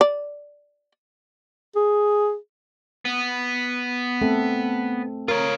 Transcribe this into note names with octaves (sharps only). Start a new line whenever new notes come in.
D5
G#4
B3
A3 C4 A4
F4 A#4 C#5